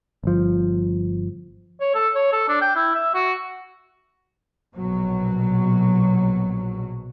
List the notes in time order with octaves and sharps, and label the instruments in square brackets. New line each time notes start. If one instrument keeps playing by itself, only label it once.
[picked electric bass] G1 F3
[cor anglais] C#5
A4
C#5
A4
D4
G5
E4
E5
F#4
[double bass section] A#1 B2 F#3